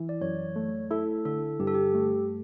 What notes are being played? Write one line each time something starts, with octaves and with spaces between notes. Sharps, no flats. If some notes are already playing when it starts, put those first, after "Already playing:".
Already playing: E3 E4
D5
F#2 C#5
A3
E4 A4
D3 A4
G2 G4
A4
G4
A3